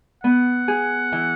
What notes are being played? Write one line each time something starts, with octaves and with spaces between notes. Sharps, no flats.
B3 F#5
G#4
E3